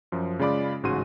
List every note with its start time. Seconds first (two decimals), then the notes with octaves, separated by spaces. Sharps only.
0.12 F#2 F3
0.39 C#3 G#3 F4 D5 B5 D6
0.83 A1 G#2 C#3 F#4 C6 D#7